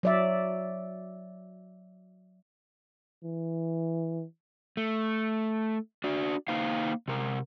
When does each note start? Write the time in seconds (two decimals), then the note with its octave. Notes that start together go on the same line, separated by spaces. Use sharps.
0.03 F#3 D5 E5
3.24 E3
4.77 A3
6.04 D4 F#4 D5
6.48 A#3 D#4 C5 F5
7.08 C3 A#4